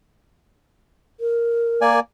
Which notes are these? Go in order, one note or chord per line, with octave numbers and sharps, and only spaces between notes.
A#4
A#3 D5 G#5